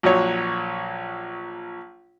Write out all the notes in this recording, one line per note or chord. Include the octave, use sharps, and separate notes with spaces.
A#1 A#2 F#3 C#5